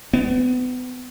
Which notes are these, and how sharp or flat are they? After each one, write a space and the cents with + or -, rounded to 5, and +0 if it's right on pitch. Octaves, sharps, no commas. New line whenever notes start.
B3 +30